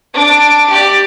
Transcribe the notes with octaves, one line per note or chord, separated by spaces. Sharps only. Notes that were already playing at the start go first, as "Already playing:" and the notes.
D4 D7
G4 D5